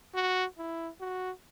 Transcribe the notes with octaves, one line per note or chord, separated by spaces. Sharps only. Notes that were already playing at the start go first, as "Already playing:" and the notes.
F#4
E4
F#4